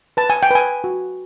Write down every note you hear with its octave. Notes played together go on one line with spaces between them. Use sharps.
B4 A5
G#5
G5
B4 G#5
F#4